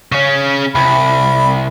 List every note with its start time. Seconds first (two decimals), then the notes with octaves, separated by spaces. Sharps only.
0.12 C#3 C#4
0.75 C2 B5